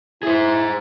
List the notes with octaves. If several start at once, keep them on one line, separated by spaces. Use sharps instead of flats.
E4 G#4 C5